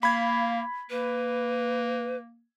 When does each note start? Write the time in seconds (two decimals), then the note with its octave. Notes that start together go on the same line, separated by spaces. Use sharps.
0.03 A#3 F5 B5 G#6
0.90 A#3 B4